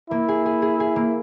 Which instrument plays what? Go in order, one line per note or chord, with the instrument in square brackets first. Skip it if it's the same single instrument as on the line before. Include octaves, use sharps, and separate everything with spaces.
[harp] A#3 [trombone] E4
[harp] G#4
G#4
G#4
G#4
A#3